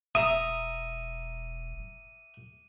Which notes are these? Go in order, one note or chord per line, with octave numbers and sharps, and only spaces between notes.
E1 E5 A#5 D#6 D#7